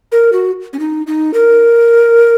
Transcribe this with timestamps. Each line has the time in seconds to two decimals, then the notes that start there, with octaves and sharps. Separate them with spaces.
0.12 A#4
0.33 F#4
0.73 C#4
0.79 D#4
1.07 D#4
1.34 A#4